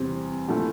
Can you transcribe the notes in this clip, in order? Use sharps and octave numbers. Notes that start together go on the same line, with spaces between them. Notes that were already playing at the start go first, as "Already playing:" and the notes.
Already playing: E2 C3 G3 C4
A#2 F3 A3 E4